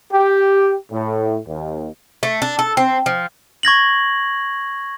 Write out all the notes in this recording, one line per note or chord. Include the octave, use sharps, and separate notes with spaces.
G4
A2
D#2
A3
D4
A4
C4
F3
C#6 G#6 A#6 F#7